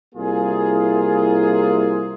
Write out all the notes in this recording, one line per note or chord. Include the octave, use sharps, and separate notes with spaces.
C2 A#3 E4 F4 G#4